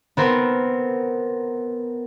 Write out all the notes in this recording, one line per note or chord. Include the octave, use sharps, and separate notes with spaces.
B3 C4 A#4